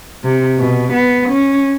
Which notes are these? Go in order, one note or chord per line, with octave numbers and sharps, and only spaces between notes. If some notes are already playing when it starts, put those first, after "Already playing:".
C3
B2
B3
C#4